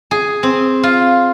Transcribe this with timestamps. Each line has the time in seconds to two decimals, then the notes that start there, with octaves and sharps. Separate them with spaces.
0.11 G#4
0.43 C4
0.83 F4